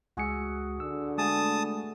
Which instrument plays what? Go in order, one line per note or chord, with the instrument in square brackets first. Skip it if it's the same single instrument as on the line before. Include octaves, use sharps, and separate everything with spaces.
[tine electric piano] C#2 G#3 C#7 [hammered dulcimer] F#4 G#4 E5
[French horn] D3 [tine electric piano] E6
[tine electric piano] G#3 A6 [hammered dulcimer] A3 B3 G#4 [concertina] A5 D#6